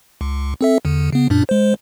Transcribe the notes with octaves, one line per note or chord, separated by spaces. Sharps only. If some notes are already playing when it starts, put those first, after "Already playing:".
C#2
C4 A4 E5
E2 D3
C#3 B3
F#2 A#2 D4
G#3 C5